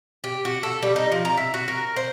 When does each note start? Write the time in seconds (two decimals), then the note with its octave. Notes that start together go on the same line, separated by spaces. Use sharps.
0.24 G4
0.45 F#4
0.63 A4
0.83 G3
0.96 D#4
1.12 F3
1.25 A#5
1.37 E4
1.54 F#4
1.68 A#4
1.96 C5